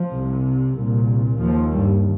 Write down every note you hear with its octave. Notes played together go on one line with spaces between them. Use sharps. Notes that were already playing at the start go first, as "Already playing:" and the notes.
Already playing: F3
C2 C3
C2
A#2
D#2 F3
G2 G3